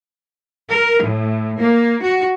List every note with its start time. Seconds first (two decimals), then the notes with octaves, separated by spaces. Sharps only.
0.69 A#4
1.03 A2
1.58 A#3
2.03 F#4